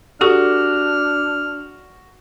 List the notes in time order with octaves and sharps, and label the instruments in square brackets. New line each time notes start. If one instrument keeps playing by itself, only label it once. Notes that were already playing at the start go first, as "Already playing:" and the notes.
[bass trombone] D4 [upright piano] F#4 [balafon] G4 A4 C#6 [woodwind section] F6